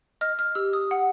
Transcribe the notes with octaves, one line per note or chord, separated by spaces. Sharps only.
D#5 F6
F6
G4 E6
D#6
F#5